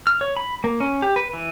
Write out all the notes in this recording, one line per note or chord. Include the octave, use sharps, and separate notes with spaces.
F6
C#5
B5
A#3
C#4
G4
B4
E3